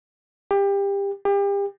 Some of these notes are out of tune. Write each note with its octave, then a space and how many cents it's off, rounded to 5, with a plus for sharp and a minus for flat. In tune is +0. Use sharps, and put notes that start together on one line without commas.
G4 +25
G4 +35